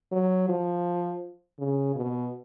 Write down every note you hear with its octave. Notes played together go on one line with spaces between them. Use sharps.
F#3
F3
C#3
B2